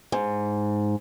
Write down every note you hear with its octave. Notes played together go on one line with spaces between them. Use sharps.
G#2